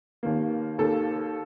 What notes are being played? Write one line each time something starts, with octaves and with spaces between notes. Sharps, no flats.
D#2 D#3 A#3
D#2 D#3 A#3 A4